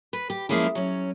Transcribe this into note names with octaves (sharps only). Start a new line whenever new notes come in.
B4
G4
F3 F#3 G#3 A#3 C#4 E4
F#3 C#4